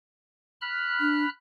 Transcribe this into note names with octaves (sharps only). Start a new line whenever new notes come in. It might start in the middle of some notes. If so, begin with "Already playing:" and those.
B5 F6 F#6
D4